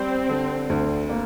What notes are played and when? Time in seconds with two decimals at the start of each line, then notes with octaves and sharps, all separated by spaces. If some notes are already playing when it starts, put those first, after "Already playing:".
Already playing: G3 C4
0.29 D3
0.70 D2
1.09 A#3